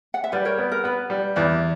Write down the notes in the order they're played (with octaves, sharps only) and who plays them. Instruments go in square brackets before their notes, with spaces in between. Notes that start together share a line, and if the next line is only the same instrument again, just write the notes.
[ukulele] F#5
E5
[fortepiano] G3 [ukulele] B4 D5
[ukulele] A#4 C#5
[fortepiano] B3
[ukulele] A#4
[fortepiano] B3 [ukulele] B4
[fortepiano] G3
[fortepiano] E2 [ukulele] B4 D5